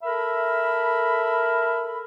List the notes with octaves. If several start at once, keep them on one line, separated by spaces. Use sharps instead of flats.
A4 A#4 E5 B5